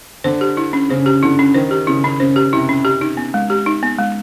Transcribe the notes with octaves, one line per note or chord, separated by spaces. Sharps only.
D3 C5
G4
E4
C#4
C#3 C5
G4
D3 E4
C#4
D#3 C5
G4
C#3 E4
C#4
C#3 C5
G4
C3 E4
C#4
G4
D#4
B3
G#3
G4
D#4
B3
G#3